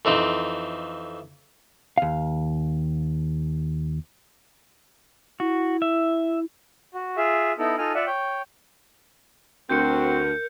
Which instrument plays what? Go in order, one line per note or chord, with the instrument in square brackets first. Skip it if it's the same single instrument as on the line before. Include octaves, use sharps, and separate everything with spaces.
[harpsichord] F2 E3 C4 D#4
[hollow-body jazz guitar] D#2 F5
[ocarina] E4 [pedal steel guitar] F#4
[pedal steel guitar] E5
[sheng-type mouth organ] F#4
F4 G#4 E5
B3 D#4 E4 A4
D#4 F4 A4 G#5 F6
F4 D5 E5 F#5
C#5 G5
[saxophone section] D2 [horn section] C4 F#4 [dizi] A#4 [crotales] G6 C#7